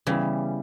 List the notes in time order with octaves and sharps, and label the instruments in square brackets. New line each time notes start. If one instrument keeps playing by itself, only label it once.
[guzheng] C#3 E3 [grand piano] G3 B3 E4 G4